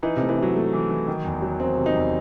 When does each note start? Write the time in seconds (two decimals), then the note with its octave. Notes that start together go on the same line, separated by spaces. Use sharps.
0.03 E3 D#4
0.16 C3
0.21 A3
0.29 E3
0.38 F#3 D#4
0.56 A3
0.73 E3
0.90 E3
1.08 D#3
1.24 E2
1.42 F#3
1.60 D#3 C4
1.77 C3
1.86 D#4
1.95 E2